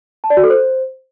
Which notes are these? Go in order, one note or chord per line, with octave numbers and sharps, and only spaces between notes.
A5
D5
F#4
A4
C5